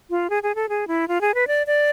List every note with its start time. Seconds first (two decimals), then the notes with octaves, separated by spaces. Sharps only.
0.10 F4
0.30 G#4
0.43 G#4
0.55 A4
0.69 G#4
0.88 E4
1.08 F4
1.21 G#4
1.34 B4
1.47 D5
1.67 D5